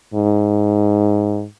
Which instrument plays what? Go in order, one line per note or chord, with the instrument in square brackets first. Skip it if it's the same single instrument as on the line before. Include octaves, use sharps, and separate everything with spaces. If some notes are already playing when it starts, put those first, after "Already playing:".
[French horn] G#2